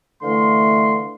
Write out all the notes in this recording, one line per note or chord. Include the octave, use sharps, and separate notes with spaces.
D3 E3 A3 F5 C6